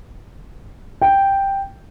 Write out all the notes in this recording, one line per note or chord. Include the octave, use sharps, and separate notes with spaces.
G5